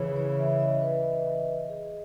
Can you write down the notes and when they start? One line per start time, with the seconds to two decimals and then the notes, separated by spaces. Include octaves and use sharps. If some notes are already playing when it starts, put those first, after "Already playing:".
Already playing: C#3 E3 G#4 C#5
0.16 C#5
0.38 E5
0.60 D#5
0.82 B4
1.04 D#5
1.26 D#5
1.48 D#5
1.70 G#4